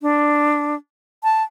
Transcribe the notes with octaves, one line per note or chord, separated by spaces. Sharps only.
D4
A5